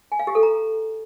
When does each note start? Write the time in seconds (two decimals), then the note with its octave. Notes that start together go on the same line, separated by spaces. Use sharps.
0.12 G#5
0.19 F5
0.27 G4
0.35 A4
0.43 A#5